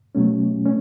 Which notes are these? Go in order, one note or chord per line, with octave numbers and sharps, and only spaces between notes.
B2 F#3 A3 C#4
A3 C#4